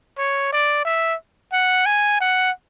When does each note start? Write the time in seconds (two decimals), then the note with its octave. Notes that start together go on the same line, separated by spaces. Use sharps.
0.18 C#5
0.52 D5
0.85 E5
1.53 F#5
1.86 G#5
2.20 F#5